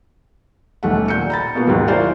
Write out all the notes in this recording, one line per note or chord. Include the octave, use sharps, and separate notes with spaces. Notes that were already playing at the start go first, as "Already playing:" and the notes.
D#1 B1 A3 F#5
A#2 G6 C#7
A#5 B5 A6
B2 A#3 B3 F4
D#2 G#2 F#3
E4 F4 A#4 C5 D5 G#5